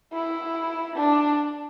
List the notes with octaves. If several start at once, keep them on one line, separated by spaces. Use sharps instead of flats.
E4
D4